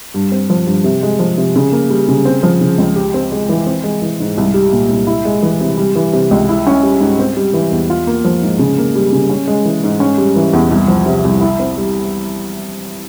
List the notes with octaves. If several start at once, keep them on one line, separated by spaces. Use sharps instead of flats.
G2
C4
F3
G2
C3
G#3
F3
C3
C#3
A#3
G3
C#3
C4
F3
C#3
C#2
G4
C4
G#3
E3
C4
G#3
E3
G#2
C2
G3
A#2
C2
E4
G#3
E3
C3
G3
E3
C3
C#2
E4
C#4
G3
G#2
C4
G3
E3
E2
F4
A#3
F3
G#2
C#3
A#3
G3
C#3
C#4
G#3
E3
G#2
C#4
G3
E3
E2
C2
F3
C3
C2
E4
C4
G3